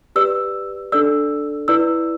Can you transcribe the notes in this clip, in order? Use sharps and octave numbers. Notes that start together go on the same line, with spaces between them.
G4 B4 D5 E6
D4 A4 D5 E6
E4 B4 D5 E6